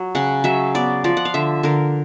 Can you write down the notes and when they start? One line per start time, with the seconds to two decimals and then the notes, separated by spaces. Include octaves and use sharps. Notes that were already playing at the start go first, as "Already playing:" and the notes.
Already playing: F#3
0.15 C#3 F#5
0.44 F#3 E5
0.75 B3 D5
1.04 F3 D5
1.17 F#5
1.25 F5
1.34 D3 E5
1.63 D3 A#4